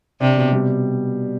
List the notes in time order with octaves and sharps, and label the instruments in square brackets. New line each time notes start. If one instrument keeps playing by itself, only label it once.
[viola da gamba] C3 [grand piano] D4
[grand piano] B2
G3